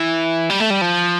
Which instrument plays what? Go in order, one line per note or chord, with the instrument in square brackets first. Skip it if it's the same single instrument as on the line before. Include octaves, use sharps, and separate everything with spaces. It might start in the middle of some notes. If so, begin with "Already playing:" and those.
Already playing: [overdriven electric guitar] E3
G3
A3
G3
F3